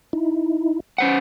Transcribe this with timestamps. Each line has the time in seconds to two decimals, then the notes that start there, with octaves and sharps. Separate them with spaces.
0.13 D#4 E4
0.98 C#4 C5 F#5